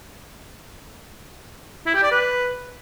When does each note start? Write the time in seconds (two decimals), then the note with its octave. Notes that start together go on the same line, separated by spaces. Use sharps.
1.86 E4
1.95 G4
2.03 D5
2.11 B4